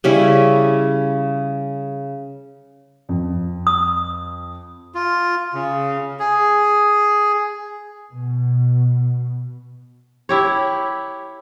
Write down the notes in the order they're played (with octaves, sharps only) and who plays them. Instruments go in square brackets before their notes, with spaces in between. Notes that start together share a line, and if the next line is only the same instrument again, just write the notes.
[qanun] C#3 G3 C#4 E4
[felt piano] F2
[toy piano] D#6
[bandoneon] F4
C#3
G#4
[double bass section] B2
[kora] E4 G4 C#5